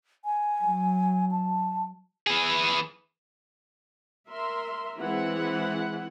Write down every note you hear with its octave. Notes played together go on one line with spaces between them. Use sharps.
G#5
F#3
A5
E3 G#4
A#4 E5 C6
E3 G#3 C4 E4 F#5